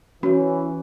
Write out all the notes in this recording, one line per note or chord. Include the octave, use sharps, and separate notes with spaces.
E3 C#4 F#4 C#5